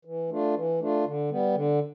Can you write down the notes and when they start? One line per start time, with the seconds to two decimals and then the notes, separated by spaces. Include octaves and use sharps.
0.05 E3
0.29 A3 D4 F4
0.55 E3
0.79 A3 D4 F4
1.05 D3
1.30 G3 B3
1.55 D3